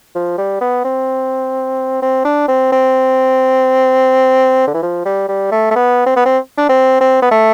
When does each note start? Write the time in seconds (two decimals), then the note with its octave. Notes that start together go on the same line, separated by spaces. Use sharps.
0.15 F3
0.38 G3
0.61 B3
0.84 C4
2.02 C4
2.25 D4
2.48 C4
2.72 C4
4.67 D3
4.74 E3
4.83 F3
5.05 G3
5.29 G3
5.52 A3
5.71 A3
5.76 B3
6.06 C4
6.16 B3
6.25 C4
6.57 D4
6.69 C4
7.01 C4
7.22 B3
7.31 A3